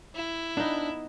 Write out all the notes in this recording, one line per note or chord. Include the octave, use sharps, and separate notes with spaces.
E4
B3 D4 D#4